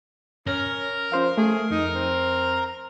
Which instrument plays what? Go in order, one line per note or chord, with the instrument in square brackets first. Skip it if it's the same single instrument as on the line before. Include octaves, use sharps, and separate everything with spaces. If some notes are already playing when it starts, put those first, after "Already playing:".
[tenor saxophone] C#4 [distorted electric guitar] A#4
[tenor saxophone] F3 [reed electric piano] C#4 C5 F5
[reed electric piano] A3 [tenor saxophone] G#4
[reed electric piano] F2 [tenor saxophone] D#4
[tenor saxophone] C4